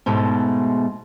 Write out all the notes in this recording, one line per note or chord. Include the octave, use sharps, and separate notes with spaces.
G#2 B2 G#3 A3